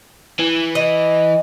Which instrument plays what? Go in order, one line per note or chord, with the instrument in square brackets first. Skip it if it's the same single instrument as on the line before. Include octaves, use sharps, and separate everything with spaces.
[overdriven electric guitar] E3
[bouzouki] D#5